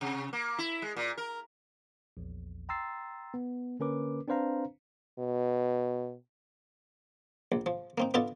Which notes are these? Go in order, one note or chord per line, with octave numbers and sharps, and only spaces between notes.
C3
A#3
E4
G#3
A#2
A#4
A#1 E2
G5 A#5 C6 E6 A6 C7
B3
D3 A#3 C#4 A#4 B4 D6
C4 D4 B4 C5 F5 A#5
B2
A#1
F3
A#3 C4 D#4
B3 D4 F4 A4 D#5 A5